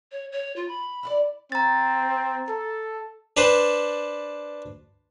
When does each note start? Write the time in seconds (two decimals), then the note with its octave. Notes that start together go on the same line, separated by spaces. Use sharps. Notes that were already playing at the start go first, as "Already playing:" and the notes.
0.12 C#5
0.32 C#5
0.56 F4
0.68 B5
1.03 E4 F4 D5
1.52 C4 A#5 A6
2.49 A4
3.37 D4 B4 C5 A5